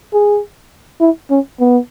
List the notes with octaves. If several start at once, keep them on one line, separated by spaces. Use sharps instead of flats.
G#4
E4
C#4
B3